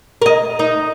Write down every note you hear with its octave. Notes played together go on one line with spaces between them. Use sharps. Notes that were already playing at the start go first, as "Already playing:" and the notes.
A#4 D#5
D#4